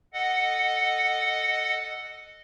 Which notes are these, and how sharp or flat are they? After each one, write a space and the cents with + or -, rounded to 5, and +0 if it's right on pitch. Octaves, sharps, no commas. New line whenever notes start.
A4 +0 D#5 -10 F#5 +0